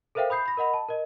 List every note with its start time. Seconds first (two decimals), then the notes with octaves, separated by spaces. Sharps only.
0.15 A4 A#4 C5 E5 F5 G5
0.30 B5 D#6 G6 C7
0.46 B5 A#6
0.57 A#4 D#5 F#5 B5
0.74 A5
0.89 A#4 D#5